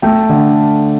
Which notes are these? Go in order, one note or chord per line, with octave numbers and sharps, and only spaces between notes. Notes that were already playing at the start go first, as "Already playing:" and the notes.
A3 G5
D3